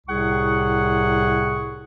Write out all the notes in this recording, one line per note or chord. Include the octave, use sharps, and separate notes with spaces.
C2 A2 C3 G#4 F#5 C#6